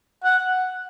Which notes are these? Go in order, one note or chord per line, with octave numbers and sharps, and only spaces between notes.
F#5